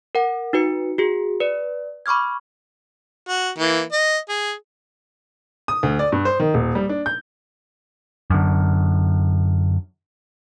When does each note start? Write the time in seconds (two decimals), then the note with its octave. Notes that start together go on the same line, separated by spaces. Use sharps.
0.15 A#4 F#5
0.53 D#4 F#4 B4 C#7
0.98 F#4 G#4
1.40 B4 D5
2.06 B5 C#6 D6 F6 G#6
3.28 F#4
3.59 E3 A#3
3.92 D#5
4.29 G#4
5.68 D#6
5.83 D2
5.99 D5
6.12 G2
6.25 C5
6.40 D#3
6.54 D#1
6.75 G3
6.89 D4
7.06 G6
8.30 F#2 D3